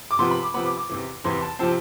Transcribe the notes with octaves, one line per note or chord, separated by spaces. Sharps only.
D6
C3 F3 B3 C6
B5
D6
C3 F3 B3 B5
D6
D6
E2 C3 E3
E2 C3 E3 C6
A5
C3 F3 C4 A5